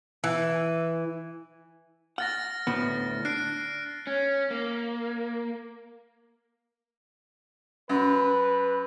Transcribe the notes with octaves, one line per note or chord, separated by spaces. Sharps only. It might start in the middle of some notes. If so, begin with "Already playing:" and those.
E3
F#5 F6 A6 A#6
D2 A2 B3
D4 F#6 C7 D7
C#4
A#3
F#2 B4